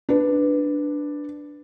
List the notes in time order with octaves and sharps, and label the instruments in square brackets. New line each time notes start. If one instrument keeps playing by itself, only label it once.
[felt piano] D4 B4